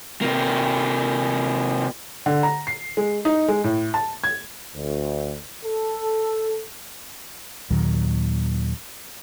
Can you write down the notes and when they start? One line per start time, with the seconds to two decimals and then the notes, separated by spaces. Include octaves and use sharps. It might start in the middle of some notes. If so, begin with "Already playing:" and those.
0.21 C3 A#3
2.26 D3
2.43 A#5
2.67 C7
2.97 G#3
3.25 D#4
3.48 G#3
3.64 A2
3.94 A5
4.24 G#6
4.75 D2
5.63 A4
7.71 D#2 A#2 D#3 F#3